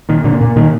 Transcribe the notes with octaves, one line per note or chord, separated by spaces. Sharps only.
A#2 D#3
A#2 D3
A#2
A#2 D#3